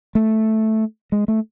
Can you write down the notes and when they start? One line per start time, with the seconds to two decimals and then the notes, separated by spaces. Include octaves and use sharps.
0.15 A3
1.12 G#3
1.28 A3